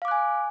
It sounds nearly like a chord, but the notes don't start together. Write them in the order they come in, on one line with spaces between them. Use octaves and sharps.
F5 D6 F#6 G#5